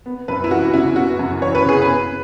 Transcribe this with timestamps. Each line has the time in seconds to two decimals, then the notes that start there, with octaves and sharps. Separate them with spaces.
0.06 B3
0.28 F#2 B4
0.44 E4
0.51 E3 F#4
0.68 F#4
0.74 C#3 E4
0.96 B3 F#4
1.19 F#2
1.41 E3 C#5
1.55 B4
1.65 C#3 G#4
1.82 B4
1.87 B3